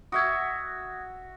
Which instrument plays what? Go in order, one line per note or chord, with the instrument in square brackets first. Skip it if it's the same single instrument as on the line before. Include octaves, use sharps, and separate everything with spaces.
[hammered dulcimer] F#4 E5 [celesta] D#6 G#6